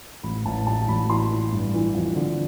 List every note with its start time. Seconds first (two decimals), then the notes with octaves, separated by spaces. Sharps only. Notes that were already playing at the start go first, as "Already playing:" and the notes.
0.23 A1 B5
0.46 A1 A5
0.67 A1 A5
0.88 A1 B5
1.10 E3 C6
1.31 E3
1.52 G2
1.74 E3
1.95 F2
2.16 D3